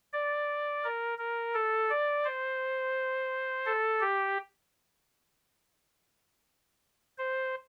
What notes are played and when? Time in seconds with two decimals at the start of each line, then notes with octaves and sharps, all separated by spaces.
0.13 D5
0.84 A#4
1.18 A#4
1.54 A4
1.90 D5
2.24 C5
3.66 A4
4.01 G4
7.18 C5